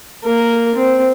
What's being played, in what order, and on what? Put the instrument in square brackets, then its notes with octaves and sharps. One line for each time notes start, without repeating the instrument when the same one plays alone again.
[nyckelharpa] A#3 A#4
C4